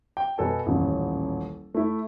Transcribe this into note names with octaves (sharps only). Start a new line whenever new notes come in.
G5
B2 B3 A4 G#5
D#1 A1
A3 E4